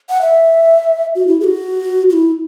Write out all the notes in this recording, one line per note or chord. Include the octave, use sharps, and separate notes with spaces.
F#5
E5
F#4
E4
G#4
F#4
F#4
E4